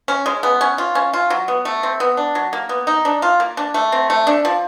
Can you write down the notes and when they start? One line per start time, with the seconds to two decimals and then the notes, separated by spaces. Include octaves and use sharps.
0.08 C#4
0.26 G#3
0.43 B3
0.61 C#4
0.78 F4
0.95 C#4
1.13 F4
1.30 F#3
1.48 B3
1.65 A3
1.83 C4
2.00 B3
2.17 D4
2.35 F#3
2.53 A#3
2.69 B3
2.87 D#4
3.05 D4
3.22 F4
3.40 A#3
3.57 D4
3.74 A3
3.92 C4
4.10 A3
4.27 D4
4.45 F3